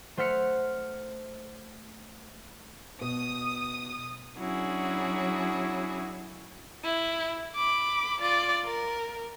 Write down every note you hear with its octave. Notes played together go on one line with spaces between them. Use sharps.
A3 C5 F#5 F6 B6 C#7
B2 D#6
F#3 C#4 D4 E4 F#4 G#4
E4
B5 D6
F4 D5
A#4